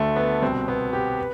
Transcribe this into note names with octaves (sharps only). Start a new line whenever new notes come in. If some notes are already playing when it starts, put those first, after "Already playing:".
Already playing: D2 D3 A3
B3
C2 B2 C4
B3
G4
B4